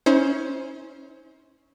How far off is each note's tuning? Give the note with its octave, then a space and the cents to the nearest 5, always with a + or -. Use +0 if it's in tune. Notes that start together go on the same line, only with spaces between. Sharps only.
C#4 +0 E4 -45 C5 +5